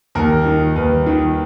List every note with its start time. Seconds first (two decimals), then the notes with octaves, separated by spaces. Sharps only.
0.15 D#2 A#4
0.46 D#3
0.76 D#2 B4
1.06 D#3